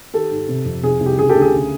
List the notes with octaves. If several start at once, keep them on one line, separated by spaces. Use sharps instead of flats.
D#3 G4 A4
G#2
C3
F2
C3 G#4
C2
G4
C#3 G#4
G4 A4
D2
G#4
C#3